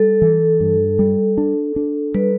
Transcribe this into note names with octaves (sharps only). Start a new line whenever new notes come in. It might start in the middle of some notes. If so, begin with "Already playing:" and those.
Already playing: G3 A4
E3
G2
G3
D4
D4
G3 B4